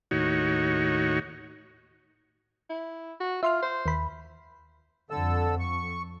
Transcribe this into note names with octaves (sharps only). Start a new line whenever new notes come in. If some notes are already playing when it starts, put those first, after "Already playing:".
D#2 A2 D#4 F#4 C#5
E4
F#4
F4 E5 C6 F6
C5
D#2 B5
F2 D3 A4 E6
C#6